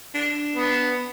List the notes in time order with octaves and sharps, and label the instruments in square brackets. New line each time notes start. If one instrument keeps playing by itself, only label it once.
[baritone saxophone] D4
[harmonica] B3